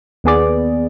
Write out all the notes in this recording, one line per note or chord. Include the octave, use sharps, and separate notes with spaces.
D#2 B3 G#4 D5